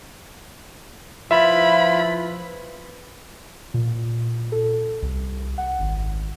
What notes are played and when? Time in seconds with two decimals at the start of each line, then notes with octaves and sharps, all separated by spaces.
1.31 F3 E4 F4 B4 E5 B5
3.74 A#2
4.52 A4
5.02 C2
5.58 F#5
5.79 G#1